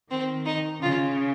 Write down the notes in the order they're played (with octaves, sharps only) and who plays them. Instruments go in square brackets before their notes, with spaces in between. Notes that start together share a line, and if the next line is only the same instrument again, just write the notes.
[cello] D#3 [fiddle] C4
[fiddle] D#4
[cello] C#3 [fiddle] F4